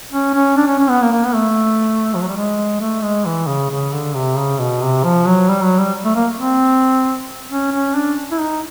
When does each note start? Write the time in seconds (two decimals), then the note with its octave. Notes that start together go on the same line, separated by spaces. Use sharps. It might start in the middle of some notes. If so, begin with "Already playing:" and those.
0.12 C#4
0.34 C#4
0.57 D4
0.67 C#4
0.79 C#4
0.89 B3
1.02 A#3
1.12 A#3
1.24 B3
1.35 A3
2.14 F3
2.20 F#3
2.28 G3
2.36 G#3
2.80 A3
3.02 G#3
3.25 E3
3.47 C#3
3.70 C#3
3.92 D3
4.15 C3
4.36 C#3
4.59 B2
4.81 C3
5.03 F3
5.26 F#3
5.49 G3
5.63 F#3
5.79 G3
6.05 A3
6.16 A#3
6.38 C4
7.50 C#4
7.72 C#4
7.95 D4
8.31 E4
8.40 D#4